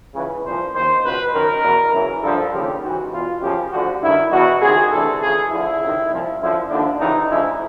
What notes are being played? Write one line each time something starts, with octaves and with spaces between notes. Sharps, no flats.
C#2 C#3 E3 B4
C2 A#2 F3 C5
D#2 D#3 C5
C#2 B2 B4
F#2 D#3 A#4
E2 B2
F#2 C#3 E3
G2 D3 F3 A4
D#2 C#3 F3 G4
G#2 E3 F#4
E2 B2 F4
F#2 C#3 F3 G4
D2 D3 F3 F#4
G2 D#3 E4
E2 B2 F#4
C#2 C3 D#3 G#4
D2 C3 E3 A4
C#2 C#3 E3 G#4
D2 D3 F3 E4
C#2 C3 D#3
C2 A#2 F3
F#2 D3 F3 E4
D#2 D3 F3 D4
C#2 C3 E3 D#4
D2 C#3 F3 E4